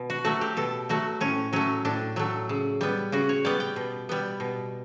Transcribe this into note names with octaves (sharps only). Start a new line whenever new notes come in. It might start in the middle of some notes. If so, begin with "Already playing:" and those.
Already playing: B2
F#4
F#3 A3 F#4
G4
B2 A4
F#3 A3 F#4
A2 C#4
F#3 A3 C#4
A2 D4
F#3 A3
C#3
G3 B3
C#3 F#4
C#5
G3 B3 D5
G5
B2
G3 B3
B2